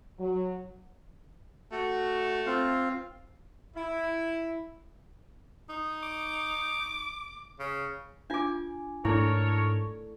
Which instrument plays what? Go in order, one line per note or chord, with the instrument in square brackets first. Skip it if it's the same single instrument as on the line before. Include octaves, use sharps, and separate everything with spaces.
[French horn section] F#3
[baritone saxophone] A3 [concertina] F#4
[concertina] C4 F4 F5
[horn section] E4
[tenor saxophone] D#4
[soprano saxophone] D6
[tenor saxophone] C#3
[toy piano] D4 F4 [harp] G#5 D6
[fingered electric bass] G#2 D4 [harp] A3 D5 [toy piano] E4 [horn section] A4 A#4 C#5